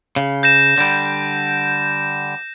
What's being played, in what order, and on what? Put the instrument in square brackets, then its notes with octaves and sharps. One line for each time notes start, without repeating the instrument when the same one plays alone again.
[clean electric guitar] C#3
[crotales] G6 A#6 E7
[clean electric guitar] D3 G3